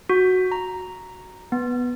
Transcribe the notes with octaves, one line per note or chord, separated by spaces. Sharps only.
F#4
A#5
B3